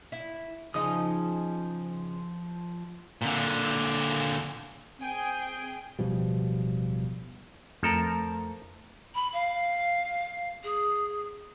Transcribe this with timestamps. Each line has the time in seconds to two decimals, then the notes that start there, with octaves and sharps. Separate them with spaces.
0.12 E4
0.74 C#3 F3 D#4 D#6
3.22 A#2 D3
4.99 C4 G#4 G5 G#5
5.99 D1 B2 F3 G3
7.83 F2 F3 A3 A4 A#4 A#5
9.14 B5
9.33 F5
10.63 G#4